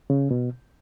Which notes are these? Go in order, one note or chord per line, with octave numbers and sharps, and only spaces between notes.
C#3
B2